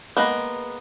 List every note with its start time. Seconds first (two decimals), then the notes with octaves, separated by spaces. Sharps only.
0.17 G#3 A#3 B3